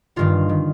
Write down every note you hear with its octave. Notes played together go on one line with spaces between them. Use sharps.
G1 G2 D#3 F4
D#3